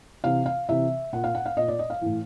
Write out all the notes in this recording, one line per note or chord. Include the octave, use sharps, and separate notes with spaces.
C3 E3 F5
F5
C3 E3 E5
A#2 F#5
F5
F#5
F5
A#2 D#5
D5
D#5
F5
A2 E3